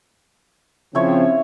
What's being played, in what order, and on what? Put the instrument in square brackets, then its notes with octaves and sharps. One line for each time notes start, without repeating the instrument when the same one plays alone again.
[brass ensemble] C#3 F3 C4 [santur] E4 C#5